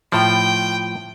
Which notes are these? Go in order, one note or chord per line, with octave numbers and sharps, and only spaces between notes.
A2 F3 G5